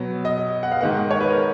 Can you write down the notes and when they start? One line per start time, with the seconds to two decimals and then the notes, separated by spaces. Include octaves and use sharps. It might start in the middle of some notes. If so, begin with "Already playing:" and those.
Already playing: B2 F#3 B3
0.25 D#5
0.63 F#5
0.72 F5
0.81 G#2 D#3 A#3 F#5
1.11 C#5
1.21 B4
1.30 A#4